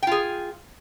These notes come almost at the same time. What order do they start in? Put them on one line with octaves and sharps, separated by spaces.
G5 F4 G#4